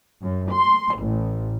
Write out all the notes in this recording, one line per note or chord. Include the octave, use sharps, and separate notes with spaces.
F#2
C6
A1